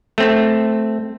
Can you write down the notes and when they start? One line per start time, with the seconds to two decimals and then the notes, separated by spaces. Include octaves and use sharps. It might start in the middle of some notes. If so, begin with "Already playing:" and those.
0.18 A3 C4